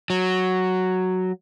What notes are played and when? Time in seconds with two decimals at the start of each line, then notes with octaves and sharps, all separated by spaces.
0.10 F#3